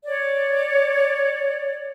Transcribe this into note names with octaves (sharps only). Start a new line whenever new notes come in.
C#5 D5